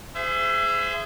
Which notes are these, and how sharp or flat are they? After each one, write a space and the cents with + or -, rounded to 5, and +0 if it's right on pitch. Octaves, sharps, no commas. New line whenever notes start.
G#4 +0 C5 -30 E5 +25